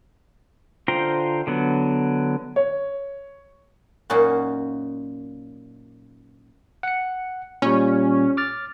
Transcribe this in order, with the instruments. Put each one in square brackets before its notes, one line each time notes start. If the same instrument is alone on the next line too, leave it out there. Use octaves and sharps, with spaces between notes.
[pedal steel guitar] D3 F4 C5 G5 A#5
D3 F#3 B3
[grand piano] C#5
[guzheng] F#2 A#2 C#4 D#4 F#4 F5
[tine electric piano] F#5 C#7
[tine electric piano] A#2 G3 [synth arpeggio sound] C#4
[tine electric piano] D6 F6 A6